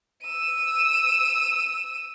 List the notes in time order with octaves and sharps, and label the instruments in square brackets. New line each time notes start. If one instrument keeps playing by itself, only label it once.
[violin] E6 D#7